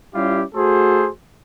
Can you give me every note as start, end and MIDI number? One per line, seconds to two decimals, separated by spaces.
0.15 0.43 55
0.15 0.43 61
0.15 0.43 64
0.15 0.43 65
0.15 0.43 67
0.55 1.09 57
0.55 1.09 66
0.55 1.09 68
0.55 1.09 69
0.55 1.09 72